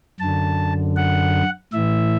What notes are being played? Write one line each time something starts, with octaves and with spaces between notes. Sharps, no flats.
F#2 D3 A5
F#5
A2 E3 E5